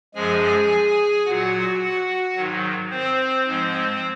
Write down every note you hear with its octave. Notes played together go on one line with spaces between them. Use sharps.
F#2 F3 G#3 G#4 G#5
A#2 F#3 F#4 F#5
G#2 D#3 F#3
C4 C5
G#2 F3 G#3